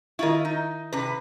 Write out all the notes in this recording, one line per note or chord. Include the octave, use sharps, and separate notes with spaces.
D#3 E4 F4 D#5 C#6
D#4
C3 C#4 B4